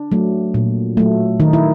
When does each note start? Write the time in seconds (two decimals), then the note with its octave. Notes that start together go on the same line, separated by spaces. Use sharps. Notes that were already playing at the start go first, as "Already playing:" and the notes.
Already playing: D4
0.11 F#3 A3
0.54 A#2
0.97 F#3 A3
1.40 D#3 D#4
1.53 E4